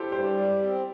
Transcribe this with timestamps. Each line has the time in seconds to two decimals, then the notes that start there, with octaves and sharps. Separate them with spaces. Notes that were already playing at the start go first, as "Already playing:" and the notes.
Already playing: E4 G4 A4 C5
0.12 G2 G4 C5
0.37 G3
0.62 C4